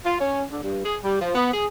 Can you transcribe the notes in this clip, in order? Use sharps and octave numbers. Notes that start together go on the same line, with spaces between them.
F4
C#4
D3
G2
G#4
G3
F3
B3
G#4